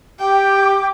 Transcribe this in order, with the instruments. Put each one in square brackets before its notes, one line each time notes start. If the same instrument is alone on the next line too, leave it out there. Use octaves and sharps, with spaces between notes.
[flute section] G4 D6 [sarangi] G5